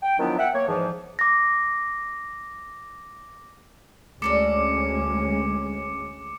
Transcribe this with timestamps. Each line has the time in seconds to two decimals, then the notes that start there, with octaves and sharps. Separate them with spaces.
0.03 G5
0.19 D#3 F3 F#3 B3 D4 E4
0.38 E5 F#5 G5
0.54 A#3 C#5
0.68 E2 G#2 E3 F3
1.19 D6 A#6
4.22 D2 G#3 C#4 A4 A#4 D5 D6 C#7